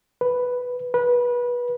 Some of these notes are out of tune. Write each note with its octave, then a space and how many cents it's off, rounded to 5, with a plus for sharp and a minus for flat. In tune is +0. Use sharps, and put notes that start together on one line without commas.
B4 +0
B4 -25